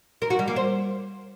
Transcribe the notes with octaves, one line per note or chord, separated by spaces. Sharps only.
A#4
F#4
G3
A#3
C5